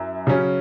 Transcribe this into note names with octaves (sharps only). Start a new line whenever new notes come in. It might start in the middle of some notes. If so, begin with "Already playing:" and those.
Already playing: F#2 E4
C#3 F#3 C#4